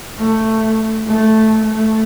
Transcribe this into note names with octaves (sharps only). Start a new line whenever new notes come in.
A3
A3
A3